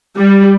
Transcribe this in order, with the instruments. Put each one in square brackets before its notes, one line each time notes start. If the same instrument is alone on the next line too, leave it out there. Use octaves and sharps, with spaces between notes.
[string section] G3